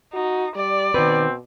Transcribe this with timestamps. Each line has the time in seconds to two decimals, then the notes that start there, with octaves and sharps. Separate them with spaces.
0.13 D#4 F#4
0.55 G3 D5
0.94 B2 D#3 C4 B4